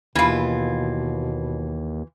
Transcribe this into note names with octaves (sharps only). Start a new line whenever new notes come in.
D#2 B2 E3 F4